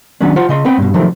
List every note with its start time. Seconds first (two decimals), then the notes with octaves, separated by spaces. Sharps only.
0.21 D#3 F#3 B3 C#4 D4
0.36 F4 C5 F5 F#5
0.49 C#3 D#5 C6
0.65 B3 C4 B4 G5
0.78 G2 B2
0.94 C3 D#3 F3 F#3 A3 C4